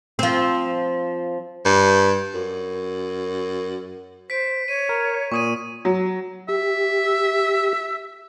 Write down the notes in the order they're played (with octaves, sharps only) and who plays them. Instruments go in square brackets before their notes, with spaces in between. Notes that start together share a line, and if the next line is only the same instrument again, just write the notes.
[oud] F3 C4
[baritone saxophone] G2
F#2
[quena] C5 [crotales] B6 D7
[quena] C#5 [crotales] D#7
[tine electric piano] A#4
[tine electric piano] A#2 [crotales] C#6 D#6 D#7
[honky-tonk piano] F#3
[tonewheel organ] G4 [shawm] E5